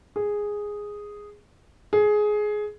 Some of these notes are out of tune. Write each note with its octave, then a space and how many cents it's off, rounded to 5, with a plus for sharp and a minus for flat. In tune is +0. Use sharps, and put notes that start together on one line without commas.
G#4 -5
G#4 +15